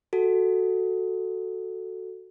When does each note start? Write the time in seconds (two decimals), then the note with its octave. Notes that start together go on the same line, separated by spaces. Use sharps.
0.13 F#4 A4